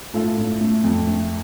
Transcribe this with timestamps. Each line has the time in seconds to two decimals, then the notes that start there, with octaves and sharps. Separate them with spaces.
0.14 A2 F4 A4
0.38 A2
0.61 A3
0.84 F2
1.07 A3